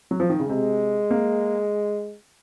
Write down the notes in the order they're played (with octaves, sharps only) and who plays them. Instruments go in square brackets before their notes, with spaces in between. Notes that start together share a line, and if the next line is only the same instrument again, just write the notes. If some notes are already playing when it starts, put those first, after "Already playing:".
[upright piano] F#3
F3
D#3
C#3
[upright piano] C3 [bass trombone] G#3
[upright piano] A#3